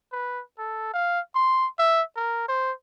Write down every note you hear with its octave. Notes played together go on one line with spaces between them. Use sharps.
B4
A4
F5
C6
E5
A#4
C5